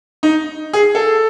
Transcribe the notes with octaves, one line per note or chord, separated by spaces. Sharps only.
D#4
G#4
A4